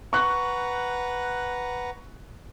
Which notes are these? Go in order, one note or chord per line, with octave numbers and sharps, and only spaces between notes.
B4 F#5 A#5 C#6 F#6